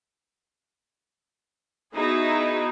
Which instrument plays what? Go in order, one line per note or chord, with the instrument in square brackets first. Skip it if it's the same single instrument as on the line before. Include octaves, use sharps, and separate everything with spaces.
[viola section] B3 D#4 E4 F#4 G#4